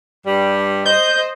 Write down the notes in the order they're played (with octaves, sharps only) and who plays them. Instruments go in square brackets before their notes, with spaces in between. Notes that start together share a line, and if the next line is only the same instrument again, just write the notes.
[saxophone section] G2 G3
[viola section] C5 D#5 [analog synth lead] G6